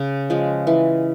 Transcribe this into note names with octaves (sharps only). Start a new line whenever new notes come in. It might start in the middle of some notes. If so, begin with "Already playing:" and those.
Already playing: C#3
F3 G#3
E3